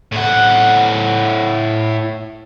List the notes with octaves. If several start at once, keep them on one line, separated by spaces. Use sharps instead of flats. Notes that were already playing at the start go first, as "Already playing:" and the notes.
A2 F#5